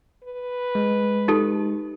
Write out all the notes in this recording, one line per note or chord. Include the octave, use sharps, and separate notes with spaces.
B4
G#3
D#4 G4 A4